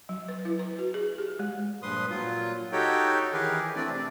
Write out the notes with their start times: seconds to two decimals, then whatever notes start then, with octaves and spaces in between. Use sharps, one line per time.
0.09 F#3
0.29 B4
0.45 E4
0.59 B4
0.79 F#4
0.94 G#4
1.18 G4
1.39 G#3
1.83 G2 A#2 F3 B4 C6 D#6
2.10 A#2 F#3 F4
2.72 D#4 F#4 G4 A4 C#5 G5
3.33 D#3 E3 G4 G#4 A#4 B4
3.76 E3 A3 C4 D4 D5
3.90 C3 D5